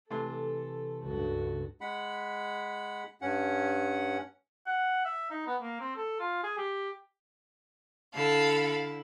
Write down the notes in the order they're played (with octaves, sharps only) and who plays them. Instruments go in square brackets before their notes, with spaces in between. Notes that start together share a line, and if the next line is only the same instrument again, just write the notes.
[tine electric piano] C3 E3 C6 [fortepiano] A3 [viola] A4
[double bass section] C#2 G2 [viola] F#4 A4
[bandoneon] G#3 F#5 B5
G2 C#4 F#5
[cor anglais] F#5
E5
D#4
B3
A#3
C4
A4
F4
G#4
G4
[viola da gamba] D3 E4 [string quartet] A4 F5